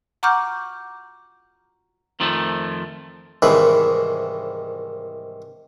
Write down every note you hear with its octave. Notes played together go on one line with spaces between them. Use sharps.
F#5 A#5 C#6 D6 F6 G6
F2 D#3 F3 A3
C2 G#2 D#3 E3 B4